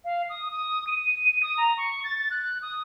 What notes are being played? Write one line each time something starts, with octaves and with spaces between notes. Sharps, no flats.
F5
D#6
D#6
D#7
D#6
A#5
C#6
A6
A6
F#6
D#6